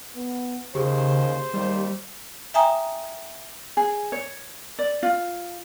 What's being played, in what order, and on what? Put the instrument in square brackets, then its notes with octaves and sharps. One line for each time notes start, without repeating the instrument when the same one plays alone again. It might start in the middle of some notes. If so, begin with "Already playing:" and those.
[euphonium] B3
[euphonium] D#2 [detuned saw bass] C#3 [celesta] G4 G#4 [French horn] C5
[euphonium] D#2 [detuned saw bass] G3
[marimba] E5 G5 G#5 A#5 D#6
[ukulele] G#4
C#5
D5
F4